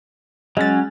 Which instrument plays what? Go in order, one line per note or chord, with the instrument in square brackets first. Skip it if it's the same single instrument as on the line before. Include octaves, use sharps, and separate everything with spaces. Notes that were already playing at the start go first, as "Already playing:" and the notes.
[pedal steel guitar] F#3 C#4 [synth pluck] G#3 A6